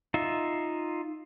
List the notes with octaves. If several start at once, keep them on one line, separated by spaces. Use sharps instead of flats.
D#4 F4 E5